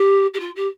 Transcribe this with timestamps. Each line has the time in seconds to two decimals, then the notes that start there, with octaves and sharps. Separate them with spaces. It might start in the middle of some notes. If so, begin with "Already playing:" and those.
Already playing: G4
0.34 G4
0.40 F4
0.56 G4